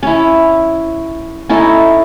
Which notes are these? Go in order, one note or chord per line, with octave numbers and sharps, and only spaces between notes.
C#4 E4
C#4 D#4 E4 A4